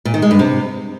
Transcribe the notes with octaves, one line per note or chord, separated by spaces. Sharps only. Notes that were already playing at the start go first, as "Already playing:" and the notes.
A#2
D#3
G#3
G2
C3